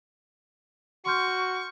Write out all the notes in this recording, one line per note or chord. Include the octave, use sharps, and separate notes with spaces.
F#4 C6 C#6 F6 G6